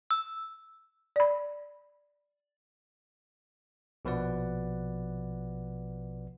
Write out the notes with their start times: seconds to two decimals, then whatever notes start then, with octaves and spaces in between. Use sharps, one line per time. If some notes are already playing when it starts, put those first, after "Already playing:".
0.11 E6
1.16 D5 B5
4.05 A#1 B2 F3 B4 D5 F#5